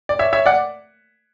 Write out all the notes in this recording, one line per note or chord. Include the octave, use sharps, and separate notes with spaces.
D5
C#5 E5
C#5 E5
D5 F#5